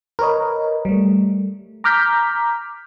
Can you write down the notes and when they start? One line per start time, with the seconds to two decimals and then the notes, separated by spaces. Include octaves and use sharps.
0.19 A#4 B4 C#5 D#5
0.85 G3 A3
1.84 A#5 D6 F6 G6 B6